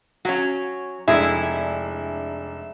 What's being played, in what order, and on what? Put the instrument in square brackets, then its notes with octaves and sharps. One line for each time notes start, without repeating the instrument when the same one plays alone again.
[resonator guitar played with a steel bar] F#3 C#4 [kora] F#4
[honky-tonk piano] F1 D4 [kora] G#3 G#4 [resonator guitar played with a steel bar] E4 [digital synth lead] E5